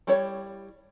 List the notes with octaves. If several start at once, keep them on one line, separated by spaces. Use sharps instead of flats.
G3 E4 C#5